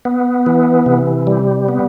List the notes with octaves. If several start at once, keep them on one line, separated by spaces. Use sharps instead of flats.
B3
E3
C3
G3
B3